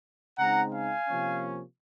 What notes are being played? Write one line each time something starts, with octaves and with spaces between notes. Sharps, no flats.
C#3 G#3 C4 D#4 F#5 A#5
F5 G#5
C3 F3 A#3 C#4